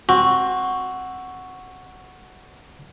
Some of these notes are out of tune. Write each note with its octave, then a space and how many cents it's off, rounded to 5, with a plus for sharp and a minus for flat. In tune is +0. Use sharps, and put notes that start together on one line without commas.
C4 +20 F#4 +0